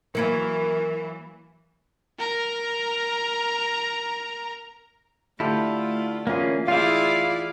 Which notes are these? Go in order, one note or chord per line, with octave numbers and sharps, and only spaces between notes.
E3 F#3 A#3 A#4 B4 G#6
A#4 A#5
D3 A3 E4 F4 G4 A4
E3 A#3 C#4 F4 G#4
E4 F4 G4 G#4 D5 E5 F5